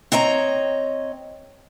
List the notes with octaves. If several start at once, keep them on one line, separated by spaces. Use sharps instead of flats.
C4 C#5 D#5 A#5